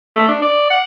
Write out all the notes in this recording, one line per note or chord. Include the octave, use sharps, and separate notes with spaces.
A3
D4
D5
F#5